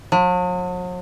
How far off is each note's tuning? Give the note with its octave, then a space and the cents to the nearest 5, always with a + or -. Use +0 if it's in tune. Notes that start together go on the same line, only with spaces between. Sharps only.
F#3 -45